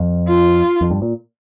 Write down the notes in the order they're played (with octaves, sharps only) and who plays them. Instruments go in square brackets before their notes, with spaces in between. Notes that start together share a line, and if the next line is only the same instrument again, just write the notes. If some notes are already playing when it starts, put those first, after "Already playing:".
Already playing: [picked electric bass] F2
[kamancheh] F4
[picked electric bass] F2
G2
A#2